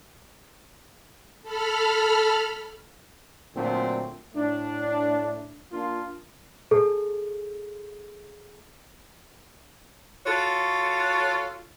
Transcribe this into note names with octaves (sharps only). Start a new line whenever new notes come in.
A4 B5 F6
A#2 D3 F#3 A3 C4
A2 A3 D4
A#3 D4 F4
G#4 A4
F4 F#4 A4 C#5